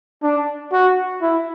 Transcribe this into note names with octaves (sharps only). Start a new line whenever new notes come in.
D4
F#4
E4